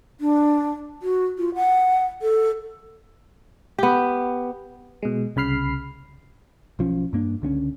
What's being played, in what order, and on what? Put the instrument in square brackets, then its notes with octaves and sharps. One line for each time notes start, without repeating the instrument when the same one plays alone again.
[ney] D4
F#4
F4
F#5
A4
[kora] B3 G4
[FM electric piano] B2 G#3
C2 C#3 B5 F6 C7
[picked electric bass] B1 F3 C#4
G2 A#3 D4
C#2 D3 C4 C#4